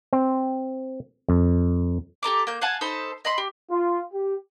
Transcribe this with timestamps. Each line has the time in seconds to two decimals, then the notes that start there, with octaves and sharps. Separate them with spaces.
0.13 C4
1.29 F2
2.23 G4 A4 A#5 D6
2.47 A#3 G6
2.62 F5 F#5 G#5 A5
2.81 D#4 A4 C5 B5
3.25 D#5 B5 C6
3.38 G4
3.70 F4
4.12 G4